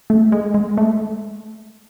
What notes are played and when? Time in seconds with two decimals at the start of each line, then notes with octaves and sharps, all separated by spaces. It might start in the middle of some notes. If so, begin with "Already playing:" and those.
0.10 A3
0.32 G#3
0.54 G#3
0.77 A3